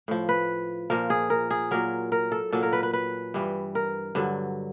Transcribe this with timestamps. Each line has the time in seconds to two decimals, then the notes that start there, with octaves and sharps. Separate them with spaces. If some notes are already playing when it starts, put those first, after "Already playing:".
0.08 A2 F3
0.29 B4
0.90 A#2 F3 A#4
1.10 G#4
1.30 A#4
1.51 G#4
1.71 A#2 F#3 A#4
2.12 A#4
2.32 A4
2.52 A#2 F#3 A4
2.63 A#4
2.73 B4
2.83 B4
2.93 B4
3.34 G2 E3 G3
3.75 A#4
4.15 G2 D3 F#3